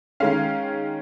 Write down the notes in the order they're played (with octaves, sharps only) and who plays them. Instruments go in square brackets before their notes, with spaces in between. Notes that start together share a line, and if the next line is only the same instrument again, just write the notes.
[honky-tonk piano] D#3 G#3 C#4 F5